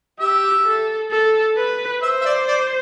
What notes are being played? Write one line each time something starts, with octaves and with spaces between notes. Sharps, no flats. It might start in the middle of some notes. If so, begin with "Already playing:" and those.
G4 E5
A4
A4
B4
C5 E5
E5
D5
D5